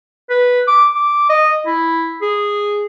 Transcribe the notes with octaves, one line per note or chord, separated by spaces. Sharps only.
B4
D6
D6
D#5
E4
G#4